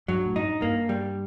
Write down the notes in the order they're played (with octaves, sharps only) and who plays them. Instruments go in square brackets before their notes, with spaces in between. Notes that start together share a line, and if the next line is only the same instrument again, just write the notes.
[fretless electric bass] G2 [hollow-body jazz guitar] F#3
[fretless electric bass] A2
[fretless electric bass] G2 [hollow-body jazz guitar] D#4
[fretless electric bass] G2 [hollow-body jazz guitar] A#3
[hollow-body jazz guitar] G3